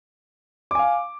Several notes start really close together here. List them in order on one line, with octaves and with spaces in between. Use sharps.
D6 G#5 F5